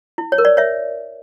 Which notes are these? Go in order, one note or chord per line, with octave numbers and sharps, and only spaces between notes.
E4
C#5
A#4
D5
C#5 E5